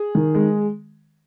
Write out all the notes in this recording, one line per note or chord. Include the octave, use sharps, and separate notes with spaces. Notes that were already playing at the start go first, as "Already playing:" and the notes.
Already playing: G#4
D#3
G#3